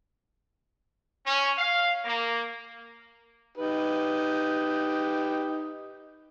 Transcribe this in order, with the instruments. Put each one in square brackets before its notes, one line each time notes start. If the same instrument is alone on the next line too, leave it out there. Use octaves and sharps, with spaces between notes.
[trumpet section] C#4
F5
A#3
[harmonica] D#4 G4 B4